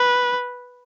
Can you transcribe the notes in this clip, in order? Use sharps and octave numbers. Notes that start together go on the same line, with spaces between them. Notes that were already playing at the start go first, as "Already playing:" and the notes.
Already playing: B4